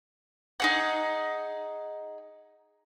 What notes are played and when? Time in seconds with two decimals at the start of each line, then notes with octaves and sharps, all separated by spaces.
0.60 D#4 G#4 F#5